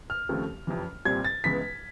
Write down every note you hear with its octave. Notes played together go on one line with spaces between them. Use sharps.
F6
D#2 C#3 F3 A3 C4
F#1 F2 C3 E3
C2 A#2 G3 C4 G#6
A6
C#2 C#3 E3 G#3 B3 B6